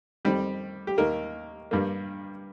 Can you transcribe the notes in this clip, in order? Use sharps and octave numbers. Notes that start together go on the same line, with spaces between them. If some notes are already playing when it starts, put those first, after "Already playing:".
F2 D#3 G3 C4 G4
G4
D#2 D#3 A#3 A#4
G2 G3 A#3